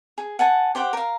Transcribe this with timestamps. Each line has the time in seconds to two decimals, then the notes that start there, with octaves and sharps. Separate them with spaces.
0.18 G#4
0.39 F#5 G#5 A5
0.75 G4 C5 F#5 G5
0.93 A#4 F5